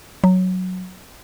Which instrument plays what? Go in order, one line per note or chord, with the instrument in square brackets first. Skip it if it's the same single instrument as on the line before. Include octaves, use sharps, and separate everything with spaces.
[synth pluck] F#3